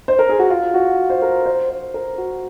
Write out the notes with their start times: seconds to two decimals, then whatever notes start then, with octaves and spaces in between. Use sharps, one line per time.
0.08 C5
0.19 A#4
0.29 G#4
0.39 F#4
0.50 F4
0.74 F#4
1.10 C5
1.22 A#4
1.46 C5
1.69 C5
1.94 A#4
2.18 F#4